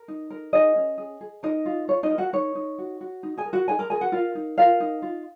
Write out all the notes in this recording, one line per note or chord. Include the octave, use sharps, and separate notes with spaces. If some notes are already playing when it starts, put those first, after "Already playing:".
Already playing: A#4
D#4
A#4
D#4 G#4 D#5
C#4
G#4
G#4
D#4 A#4 D#5
F4
F4 C#5
D#4 D#5
A#4
F#4 F#5
D#4 C#5
D#4
F#4
F#4
D#4
G#4 G#5
A#4
F#4 F#5
D#4 G#4 G#5
A#4 A#5
G#4 A#4 G#5
F#4 F#5
F4 A#4 F5
D#4
F4 A#4 F5
D#4
F4